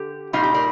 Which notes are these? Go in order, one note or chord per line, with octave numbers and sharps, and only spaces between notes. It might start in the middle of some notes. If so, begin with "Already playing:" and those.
Already playing: D3 G4
A#2 G3 C4 D#4 F4
G4
A#4 D5